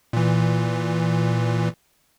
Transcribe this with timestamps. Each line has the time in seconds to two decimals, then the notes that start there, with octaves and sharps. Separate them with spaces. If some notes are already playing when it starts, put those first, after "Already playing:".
0.13 A#2 E3